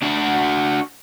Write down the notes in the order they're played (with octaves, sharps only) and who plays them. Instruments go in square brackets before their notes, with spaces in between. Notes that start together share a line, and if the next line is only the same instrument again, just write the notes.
[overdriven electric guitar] D4 F#4